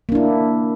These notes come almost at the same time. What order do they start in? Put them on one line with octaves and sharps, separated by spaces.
A#3 D4 E4